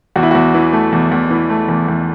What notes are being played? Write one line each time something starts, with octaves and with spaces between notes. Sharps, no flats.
E2 F#4
E4
E2 F#4
E3
A3
E2
E2
E3
A3
E2
E2